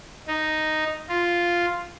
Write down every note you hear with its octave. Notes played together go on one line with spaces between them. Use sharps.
D#4
F4